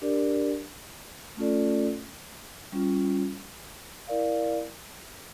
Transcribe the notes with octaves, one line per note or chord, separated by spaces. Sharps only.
D4 G4 A#4 D5
A3 C#4 F4 A4 D5
G3 C#4 F4
E4 A#4 D5 F5